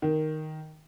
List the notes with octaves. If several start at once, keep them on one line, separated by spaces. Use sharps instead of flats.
D#3